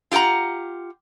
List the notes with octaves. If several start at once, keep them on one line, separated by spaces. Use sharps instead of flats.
F4 G4 A4 F#5 A#5